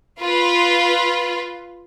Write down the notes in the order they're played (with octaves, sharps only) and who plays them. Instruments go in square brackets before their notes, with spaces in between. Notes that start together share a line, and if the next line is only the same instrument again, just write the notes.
[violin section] F4 B4